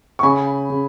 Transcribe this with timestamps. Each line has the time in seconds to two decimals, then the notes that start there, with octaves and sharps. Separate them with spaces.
0.19 C#6
0.23 C#3 G#5 B5
0.70 C#3